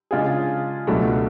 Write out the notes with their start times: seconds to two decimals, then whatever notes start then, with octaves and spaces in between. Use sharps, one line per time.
0.11 C#3 G#3 D4 F4 G#4
0.87 C#2 B2 F#3 A3 D4